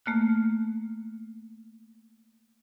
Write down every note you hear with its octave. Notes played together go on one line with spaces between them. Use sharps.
A3 A#3 F6 F#6